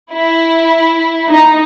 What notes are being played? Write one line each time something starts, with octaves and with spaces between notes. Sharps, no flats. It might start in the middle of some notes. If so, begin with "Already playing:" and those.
E4
D#4